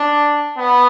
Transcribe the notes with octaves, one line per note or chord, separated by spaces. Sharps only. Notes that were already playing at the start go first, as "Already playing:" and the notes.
Already playing: D4
B3